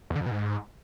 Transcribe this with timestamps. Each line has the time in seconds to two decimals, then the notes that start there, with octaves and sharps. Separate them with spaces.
0.10 E2
0.16 D3
0.21 F2
0.26 B2
0.31 G#2